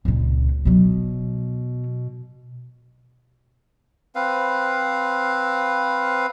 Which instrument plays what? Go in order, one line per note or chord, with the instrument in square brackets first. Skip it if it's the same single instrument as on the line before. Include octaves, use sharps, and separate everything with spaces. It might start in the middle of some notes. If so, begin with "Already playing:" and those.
[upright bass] C#2 A#2
[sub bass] B2 [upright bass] F#3 B3
[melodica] C4 B4 F5